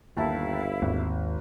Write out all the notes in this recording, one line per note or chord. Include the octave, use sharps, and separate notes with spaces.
G1 D#2 E4 F5 A5
G#1 D#2